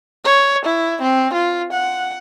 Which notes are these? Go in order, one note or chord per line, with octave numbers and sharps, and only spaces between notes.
C#5
E4
C4
F4
F#5